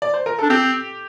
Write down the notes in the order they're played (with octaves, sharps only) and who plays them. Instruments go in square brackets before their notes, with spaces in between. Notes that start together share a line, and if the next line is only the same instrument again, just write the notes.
[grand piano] D5
C5
A#4
[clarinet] D4 [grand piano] A4
[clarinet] C4 [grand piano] G4